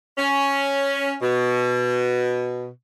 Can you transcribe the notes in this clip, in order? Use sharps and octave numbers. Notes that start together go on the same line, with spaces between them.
C#4
B2